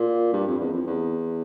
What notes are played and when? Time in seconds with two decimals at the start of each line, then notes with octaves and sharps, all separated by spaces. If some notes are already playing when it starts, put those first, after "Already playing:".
Already playing: A#2
0.33 G2
0.47 F2
0.60 E2
0.73 F2
0.87 E2